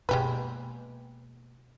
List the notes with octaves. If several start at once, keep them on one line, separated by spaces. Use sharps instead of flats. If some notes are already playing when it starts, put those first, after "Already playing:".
B2 G#3 A#3 G4 B4